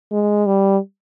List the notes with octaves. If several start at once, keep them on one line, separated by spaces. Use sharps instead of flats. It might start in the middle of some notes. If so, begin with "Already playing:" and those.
G#3
G3